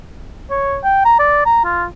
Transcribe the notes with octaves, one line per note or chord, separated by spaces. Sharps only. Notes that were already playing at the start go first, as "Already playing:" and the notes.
C#5
G5
A#5
D5
A#5
F4